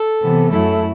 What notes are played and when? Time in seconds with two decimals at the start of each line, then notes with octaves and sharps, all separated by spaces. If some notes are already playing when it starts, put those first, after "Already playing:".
Already playing: A4
0.21 C3 E3 B3
0.51 F#2 F#3 A3 E4 A4